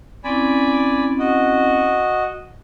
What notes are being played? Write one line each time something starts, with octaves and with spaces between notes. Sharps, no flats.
C4 C#4 E4 D5 G#5 B5
F#4 D#5